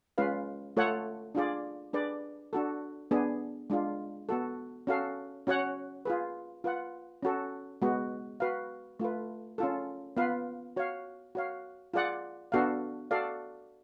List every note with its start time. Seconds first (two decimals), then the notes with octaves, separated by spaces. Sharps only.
0.18 G#3 C#4 F4 B4 F5
0.77 A3 F4 A4 C#5 F#5
1.35 D4 F4 G#4 D5
1.93 D4 G#4 B4 D5
2.53 D4 F#4 A4
3.11 B3 D4 G#4
3.70 G#3 D4 F4
4.29 B3 F#4 A4
4.87 C#4 F#4 A4 F5
5.47 C#4 F#4 C#5 F#5
6.05 F4 G#4 B4
6.64 F4 B4 F#5
7.23 C#4 F#4 A4
7.82 G#3 B3 F#4
8.40 F#4 B4 F5
9.00 A3 F4 B4
9.58 C#4 F4 A4
10.17 B3 F4 B4 F5
10.76 F#4 C#5 F5
11.35 F#4 C#5 F5
11.94 F4 G#4 D5 F#5
12.52 B3 D4 F#4 A4 F5
13.11 F#4 A4 D5 F5